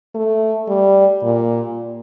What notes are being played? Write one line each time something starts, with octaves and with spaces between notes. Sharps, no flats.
A3
G3
A#2